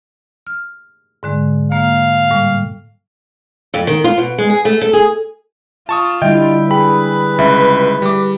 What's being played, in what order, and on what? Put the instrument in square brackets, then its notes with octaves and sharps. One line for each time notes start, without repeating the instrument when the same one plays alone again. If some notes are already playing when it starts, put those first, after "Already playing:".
[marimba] F6
G#2 D3 G#3
[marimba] A#3 [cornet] F5
[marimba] A2 G3
[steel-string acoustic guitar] F2
D#3
F4
B2
G#3
G#4
A3
A4
G#4
[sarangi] F4 [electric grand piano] A5 C#6 D#6
[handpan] D3 G3 E4 [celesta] D#5 E5 [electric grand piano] G5
[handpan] G#4 [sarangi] B4 [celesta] G5 [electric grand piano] B5
[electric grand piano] C#2 [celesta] E5
[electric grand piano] G3 D6